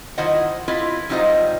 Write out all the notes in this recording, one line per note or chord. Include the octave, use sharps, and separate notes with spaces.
D#3 E4 F4 C5 D#5 F#5
E4 F4 B4 D#5
F#3 G3 D#4 F4 C5 D#5